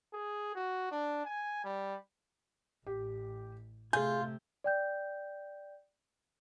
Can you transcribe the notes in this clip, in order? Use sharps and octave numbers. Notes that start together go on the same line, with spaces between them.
G#4
F#4
D4
G#5
G3
A1 G4
C3 A3 F4 G#4 G#5 G6
D5 G5 G6